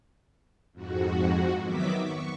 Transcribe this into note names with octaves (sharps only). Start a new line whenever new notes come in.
F2 G#2 F#4
D#3 F#3 B3 E5 D6 B6
C#6